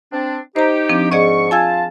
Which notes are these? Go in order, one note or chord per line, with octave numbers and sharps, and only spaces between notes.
C4 D4
D#4 G4 C5 A#5
F3 C4 D4
G#2 G#4 D5 D#5 C#6
F4 G#5 A5 E6 G#6